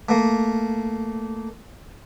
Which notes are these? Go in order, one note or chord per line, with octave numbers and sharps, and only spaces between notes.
A3 A#3